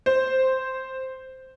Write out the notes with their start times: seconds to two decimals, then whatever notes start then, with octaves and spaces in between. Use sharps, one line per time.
0.06 C5